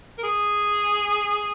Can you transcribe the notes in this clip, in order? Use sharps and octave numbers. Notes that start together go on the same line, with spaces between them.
A#4
G#4